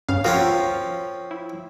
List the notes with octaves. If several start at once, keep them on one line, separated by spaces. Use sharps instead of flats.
G2 C#3 F5
F3 C4 C#4 F4 F#4 A#4
E4